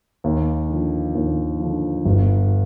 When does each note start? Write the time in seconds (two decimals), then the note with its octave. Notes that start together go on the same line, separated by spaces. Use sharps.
0.24 D#2
0.70 D3 F3
1.15 D#2
1.60 D3 F3
2.05 G1